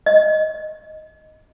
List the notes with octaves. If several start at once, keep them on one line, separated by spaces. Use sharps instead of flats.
D#5